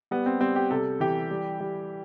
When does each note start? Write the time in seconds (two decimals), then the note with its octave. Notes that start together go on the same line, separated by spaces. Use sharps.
0.11 G3 B3
0.26 C4
0.40 G3 C4
0.56 G4
0.71 C3 A4
1.00 E3 G4
1.31 G3
1.60 G3